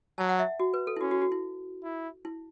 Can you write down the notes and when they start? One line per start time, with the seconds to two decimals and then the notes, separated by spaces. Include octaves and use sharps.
0.18 F#3 A5
0.29 F#5
0.39 E5
0.60 F#4
0.74 B4
0.87 A4
0.96 E4
1.01 C#4 F#4
1.11 F#4
1.22 F#4
1.32 E4
1.84 E4
2.25 E4